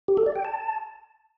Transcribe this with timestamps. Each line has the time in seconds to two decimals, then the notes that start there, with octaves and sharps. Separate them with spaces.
0.08 G4
0.17 A4
0.26 D5
0.35 G5
0.45 A5